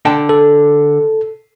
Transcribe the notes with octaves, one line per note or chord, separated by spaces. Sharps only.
D3 G5 A5
A4